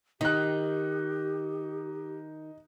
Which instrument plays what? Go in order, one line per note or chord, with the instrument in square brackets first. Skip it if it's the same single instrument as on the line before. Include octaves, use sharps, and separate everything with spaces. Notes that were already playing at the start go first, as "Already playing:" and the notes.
[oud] D#3 [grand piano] D#4 F#6 [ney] G4